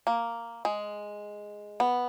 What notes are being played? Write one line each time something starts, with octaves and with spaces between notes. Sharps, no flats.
A#3
G#3
B3